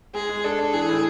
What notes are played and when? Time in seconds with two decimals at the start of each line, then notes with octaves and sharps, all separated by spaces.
0.14 G#3 G#4
0.29 G#3
0.44 D4 A4
0.59 D4
0.74 E3 G#4
0.89 A2